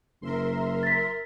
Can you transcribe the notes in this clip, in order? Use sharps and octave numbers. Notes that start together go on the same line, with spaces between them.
F#1 A#4 E5 C6
A6 B6